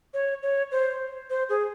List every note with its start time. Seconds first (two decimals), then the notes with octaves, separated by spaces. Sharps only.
0.14 C#5
0.43 C#5
0.72 C5
1.30 C5
1.49 G#4